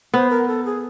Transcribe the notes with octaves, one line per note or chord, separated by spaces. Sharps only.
B3 C5
A#4
A4
G#4